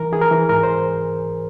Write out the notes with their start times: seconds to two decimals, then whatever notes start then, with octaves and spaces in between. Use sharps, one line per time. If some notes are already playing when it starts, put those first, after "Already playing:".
Already playing: E3 A#4
0.12 E3 G#4
0.21 A#4
0.31 E3
0.49 G#2 A#4
0.63 C5